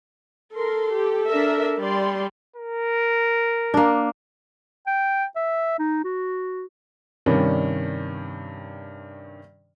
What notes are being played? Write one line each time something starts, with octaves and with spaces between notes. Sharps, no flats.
A4 A#4 C6
G4
D4 A#4 E5
G3 D5 C6
A#4
A#3 D4
G5
E5
D#4
F#4
G2 C3 D#3 C#4 D4